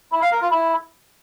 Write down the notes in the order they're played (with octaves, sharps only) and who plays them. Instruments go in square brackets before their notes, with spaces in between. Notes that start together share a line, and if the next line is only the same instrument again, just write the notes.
[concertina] E4
F5
A#4
F4
E4